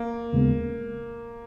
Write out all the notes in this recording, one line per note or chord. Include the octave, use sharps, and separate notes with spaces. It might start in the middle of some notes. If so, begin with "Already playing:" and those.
Already playing: A#3
D#2 C#3 G#3 B3